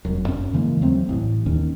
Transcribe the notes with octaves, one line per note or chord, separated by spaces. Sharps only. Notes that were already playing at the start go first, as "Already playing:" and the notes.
F1 F#2
F#2 C#4
C#3 E3 G#3 A#3
D#2 F#3 A3 C4
A1 A2
D#2 D#3 C#4